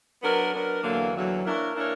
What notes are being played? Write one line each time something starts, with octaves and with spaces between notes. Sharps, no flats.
F#3 B3 D4 A#4
F#3 B3 D4 A#4
E2 D3 F#3 A#3
E2 D3 F#3 A#3
E3 A#3 D4 A#4 C#5
E3 A#3 D4 A#4 C#5